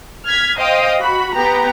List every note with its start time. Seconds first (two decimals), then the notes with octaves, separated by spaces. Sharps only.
0.25 F6 G#6 B6
0.58 C5 D#5 F5 G5 D#6
1.00 F#4 B5
1.35 B3 G4 A#5